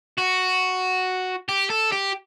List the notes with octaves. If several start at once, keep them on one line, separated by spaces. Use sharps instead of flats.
F#4
G4
A4
G4